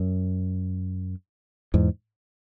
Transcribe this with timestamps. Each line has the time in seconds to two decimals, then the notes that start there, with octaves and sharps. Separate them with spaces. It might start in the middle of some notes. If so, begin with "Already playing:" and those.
Already playing: F#2
1.74 E2 G#2